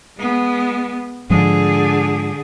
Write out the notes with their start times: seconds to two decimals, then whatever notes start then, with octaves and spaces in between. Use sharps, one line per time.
0.17 G#3 B3
1.30 G#2 D3 F3 G#3 G#4